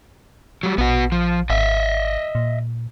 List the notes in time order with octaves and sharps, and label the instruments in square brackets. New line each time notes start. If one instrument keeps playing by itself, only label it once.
[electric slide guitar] F#3 G3
[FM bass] A#1 [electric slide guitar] B3 F#4
[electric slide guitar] F3
[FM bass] G#1 [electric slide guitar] D#5 E5
[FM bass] A#2